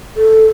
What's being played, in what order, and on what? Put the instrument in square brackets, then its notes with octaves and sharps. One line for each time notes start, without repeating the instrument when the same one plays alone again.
[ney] A4